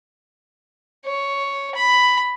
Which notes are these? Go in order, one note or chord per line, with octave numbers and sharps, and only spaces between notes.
C#5
B5